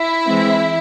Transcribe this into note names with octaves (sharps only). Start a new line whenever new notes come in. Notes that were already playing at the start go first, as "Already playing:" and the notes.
Already playing: E4 E5
E3 G#3 C4